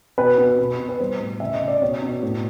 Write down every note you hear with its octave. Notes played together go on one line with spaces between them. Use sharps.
B2 B4
B2
B2
B2
B4
G3 C5
A2
C#3 E5
D#5
C#3
D5
B2 C#5
B2
A2